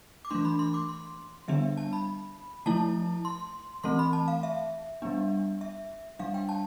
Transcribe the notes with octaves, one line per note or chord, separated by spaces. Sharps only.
D6
E3 A3 D4 C6
B5
C6
D6
C6
D3 G3 B3 D4 E5
A5
B5
F3 A3 E4 A5
C6
E3 A3 C4 C6
B5
A5
F5
E5
G3 B3 D4
E5
G3 D4 F5
G5
A5